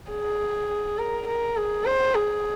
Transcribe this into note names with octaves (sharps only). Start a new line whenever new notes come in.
G#4
A#4
A#4
G#4
C5
G#4